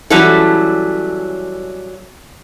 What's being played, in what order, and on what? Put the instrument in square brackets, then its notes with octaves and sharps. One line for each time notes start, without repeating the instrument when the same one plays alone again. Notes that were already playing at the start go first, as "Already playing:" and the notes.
[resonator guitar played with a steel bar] E3 F#3 G3 C#4 E4 A4